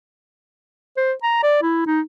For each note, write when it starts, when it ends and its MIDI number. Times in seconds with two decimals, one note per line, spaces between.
0.97 1.13 72
1.23 1.43 82
1.43 1.62 74
1.62 1.82 64
1.86 2.01 63